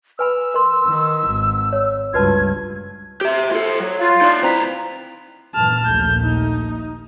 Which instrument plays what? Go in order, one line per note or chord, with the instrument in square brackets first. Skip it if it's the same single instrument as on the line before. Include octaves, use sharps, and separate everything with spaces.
[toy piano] B4 G#5 B5 [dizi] E6
[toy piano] A#4 C6
[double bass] D#3
G#1
[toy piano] C#5
[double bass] C#2 G2 [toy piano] F#4 B4 A5 [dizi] G#6
[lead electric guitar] G4 E5
F4 A4
F#3
[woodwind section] F4
[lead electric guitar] D#4 D5
[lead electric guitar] D2 A#5 [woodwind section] C4 E4 B4
[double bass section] F#2 A#2 E3 [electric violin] A5 F6
[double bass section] A#1 D#2 A3 [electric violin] G6
[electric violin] D#4